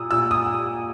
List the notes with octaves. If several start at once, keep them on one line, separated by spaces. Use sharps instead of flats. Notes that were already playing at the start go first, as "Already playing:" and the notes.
Already playing: A#2 D#6 E6
A#2 E6
D#6